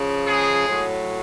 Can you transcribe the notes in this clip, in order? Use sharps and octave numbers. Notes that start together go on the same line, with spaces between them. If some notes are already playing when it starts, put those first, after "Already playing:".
Already playing: C#3 F3
G#3 G#4
A2 F#3